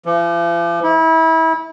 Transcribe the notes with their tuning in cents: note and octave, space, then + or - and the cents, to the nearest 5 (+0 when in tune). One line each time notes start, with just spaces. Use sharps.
F3 -45
E4 -30